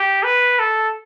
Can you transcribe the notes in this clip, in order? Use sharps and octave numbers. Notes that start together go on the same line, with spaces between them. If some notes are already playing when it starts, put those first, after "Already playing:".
Already playing: G4
B4
A4